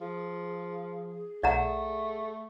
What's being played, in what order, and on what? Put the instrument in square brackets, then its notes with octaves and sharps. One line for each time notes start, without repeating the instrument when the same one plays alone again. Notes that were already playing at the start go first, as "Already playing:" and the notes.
[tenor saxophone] F3 [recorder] G#4
[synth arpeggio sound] B1 [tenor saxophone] A3 [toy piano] D5 F#5 A#5